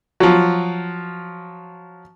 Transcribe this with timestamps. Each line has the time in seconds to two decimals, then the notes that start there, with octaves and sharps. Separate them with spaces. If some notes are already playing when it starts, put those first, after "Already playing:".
0.20 F3 F#3